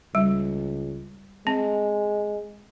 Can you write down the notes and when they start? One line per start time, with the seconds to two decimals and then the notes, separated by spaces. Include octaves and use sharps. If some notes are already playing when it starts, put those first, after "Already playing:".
0.15 C#2 G3
1.47 G#3 C4